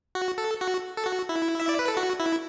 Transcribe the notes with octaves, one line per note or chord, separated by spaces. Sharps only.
F#4
A4
F#4
A4
F#4
E4
E5
D5
B4
A4
F#4
E4